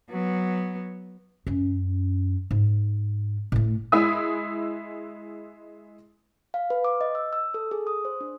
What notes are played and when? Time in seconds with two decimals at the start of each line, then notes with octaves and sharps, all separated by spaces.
0.10 F#3 B3
1.47 F#2 C#4
2.51 G#2
3.52 A2 A3
3.92 G#3 E4 E5 D#6
6.54 F5
6.70 B4
6.85 D6
7.01 D#5
7.15 E6
7.33 E6
7.54 A4
7.71 G#4
7.87 D#6
8.05 C5
8.21 D4